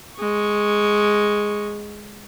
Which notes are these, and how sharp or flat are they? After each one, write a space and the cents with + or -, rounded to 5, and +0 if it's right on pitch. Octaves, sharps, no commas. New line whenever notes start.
G#3 +0 C#6 -5